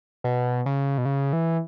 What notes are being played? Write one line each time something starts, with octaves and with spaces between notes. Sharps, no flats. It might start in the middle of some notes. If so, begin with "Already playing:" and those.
B2
C#3
B2
C#3
E3